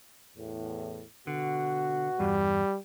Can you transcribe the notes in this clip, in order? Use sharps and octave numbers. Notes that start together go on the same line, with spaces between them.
E2 A2
B2 D3 F#4
E2 G2 G3